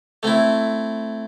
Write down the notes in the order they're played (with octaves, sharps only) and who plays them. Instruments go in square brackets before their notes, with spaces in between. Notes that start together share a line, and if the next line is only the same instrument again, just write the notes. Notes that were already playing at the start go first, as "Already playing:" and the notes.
[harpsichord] A3 C4 E4